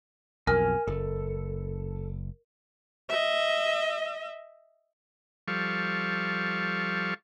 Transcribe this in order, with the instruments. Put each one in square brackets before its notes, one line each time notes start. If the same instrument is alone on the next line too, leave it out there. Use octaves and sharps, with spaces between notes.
[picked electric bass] B1 F2 [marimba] A#4 [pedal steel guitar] G#5 F6
[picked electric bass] F#1 [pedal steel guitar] A4
[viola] D#5 E5
[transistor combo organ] F3 G3 A4 F5 C#6